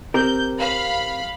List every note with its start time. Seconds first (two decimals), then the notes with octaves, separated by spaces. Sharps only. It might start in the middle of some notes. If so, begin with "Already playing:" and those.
0.14 C4 G4 A#4 G6
0.58 F5 B5